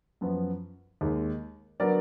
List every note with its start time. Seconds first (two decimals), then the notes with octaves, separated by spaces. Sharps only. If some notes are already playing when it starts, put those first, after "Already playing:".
0.21 F#2 F3 B3
1.01 D#2 D#3 G#3
1.80 D3 F#3 B3 A#4 D5